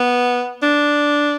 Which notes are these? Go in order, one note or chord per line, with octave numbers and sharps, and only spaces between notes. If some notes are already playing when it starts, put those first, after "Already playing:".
Already playing: B3
D4